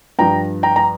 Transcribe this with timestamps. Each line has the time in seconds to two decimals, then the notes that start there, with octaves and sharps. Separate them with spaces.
0.19 G2 F3 G5 A#5
0.63 G5 A#5
0.76 A#5